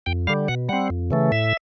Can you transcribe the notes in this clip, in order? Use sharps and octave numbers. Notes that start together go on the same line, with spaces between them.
F2 G5
D3 G3 F5
B2 F#5
G3 C4 F#5
F2
C#3 E3 A3
A2 E5